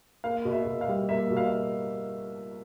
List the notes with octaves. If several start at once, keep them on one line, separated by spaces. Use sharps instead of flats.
A#3 F5
B2
E5
B2
F5
G3
A#3 E5
B2
F5